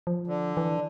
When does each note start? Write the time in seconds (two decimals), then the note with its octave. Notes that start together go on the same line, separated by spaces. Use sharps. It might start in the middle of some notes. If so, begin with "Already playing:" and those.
0.07 F3
0.27 D3
0.57 E3